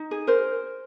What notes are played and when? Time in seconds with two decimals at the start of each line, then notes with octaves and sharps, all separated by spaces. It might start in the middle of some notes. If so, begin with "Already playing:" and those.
Already playing: D#4
0.11 G#4
0.27 A#4 C5